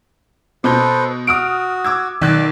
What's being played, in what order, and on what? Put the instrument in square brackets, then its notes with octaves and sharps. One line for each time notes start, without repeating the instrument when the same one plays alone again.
[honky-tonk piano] B2 G6 [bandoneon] A4 B4 C5
[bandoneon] F#4 [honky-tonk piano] D#6 F6 D7
[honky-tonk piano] D6 E6 G#6
[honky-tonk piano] B1 F#6 [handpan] D#3 [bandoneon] D5